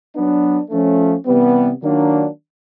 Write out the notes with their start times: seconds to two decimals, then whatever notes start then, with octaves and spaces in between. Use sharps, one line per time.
0.14 F#3 B3 D4
0.70 F3 A3 C#4
1.25 C3 E3 G3 B3
1.81 D#3 F#3 A#3 D4 F4